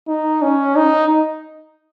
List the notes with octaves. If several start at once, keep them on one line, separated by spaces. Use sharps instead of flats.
D#4
C#4
D#4